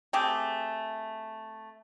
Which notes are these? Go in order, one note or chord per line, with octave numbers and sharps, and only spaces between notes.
A3 C4 G4 G#4